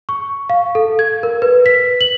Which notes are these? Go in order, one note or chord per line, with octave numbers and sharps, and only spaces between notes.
C#6
F5
A4
G#6
A#4
B4
B6
F#7